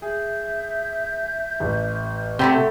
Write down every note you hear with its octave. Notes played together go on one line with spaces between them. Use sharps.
G#4 E5 G6
A1
C3 A3 E4 G4 F#5 B5 C6